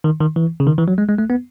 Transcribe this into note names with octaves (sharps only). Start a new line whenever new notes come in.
D#3
D#3
E3
C#3
D#3
E3
F#3
G#3
G#3
A3
B3